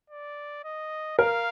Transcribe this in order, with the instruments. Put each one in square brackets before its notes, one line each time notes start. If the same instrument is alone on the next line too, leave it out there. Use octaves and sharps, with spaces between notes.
[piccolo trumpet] D5
D#5
[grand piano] A#4 [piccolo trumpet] F5